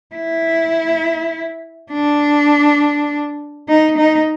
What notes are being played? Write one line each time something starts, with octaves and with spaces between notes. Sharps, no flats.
E4
D4
D#4
D#4